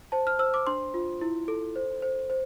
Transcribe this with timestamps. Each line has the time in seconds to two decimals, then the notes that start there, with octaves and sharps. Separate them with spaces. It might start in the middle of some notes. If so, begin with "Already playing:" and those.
0.12 C5 A5
0.27 F6
0.39 C5 E6
0.54 D6
0.67 D4 C6
0.94 F4
1.21 E4
1.48 A4
1.76 C5
2.02 C5
2.30 C5